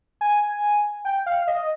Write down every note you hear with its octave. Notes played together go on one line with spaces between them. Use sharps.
G#5
G5
F5
D#5